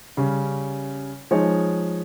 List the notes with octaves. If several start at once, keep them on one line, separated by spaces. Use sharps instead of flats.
C#3 G3 C#4
F3 G#3 D#4 G#4 C#5